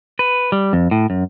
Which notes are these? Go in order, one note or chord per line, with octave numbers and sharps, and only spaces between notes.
B4
G3
F2
A2
F#2